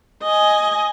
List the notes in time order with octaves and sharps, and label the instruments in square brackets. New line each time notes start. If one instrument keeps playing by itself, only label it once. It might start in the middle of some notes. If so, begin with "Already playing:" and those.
[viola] D#5 G#5